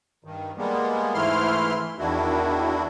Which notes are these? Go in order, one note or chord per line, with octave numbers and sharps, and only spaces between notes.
G2 D#3
G3 G#3 A#3 B3
G#2 E3 A3 E4 C6 F6
E2 D#3 D4 E4 F#4